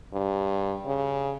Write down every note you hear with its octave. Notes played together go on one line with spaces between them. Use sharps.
G2
C#3